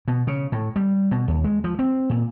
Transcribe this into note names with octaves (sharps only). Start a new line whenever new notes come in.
B2
C#3
A2
G3
B2
D#2
G#3
F3
C4
A#2